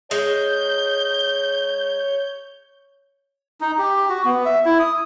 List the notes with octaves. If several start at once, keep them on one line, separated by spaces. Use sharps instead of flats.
G#3 C#5 G6
D#4
G4
F#4
B3
E5
E4
D#6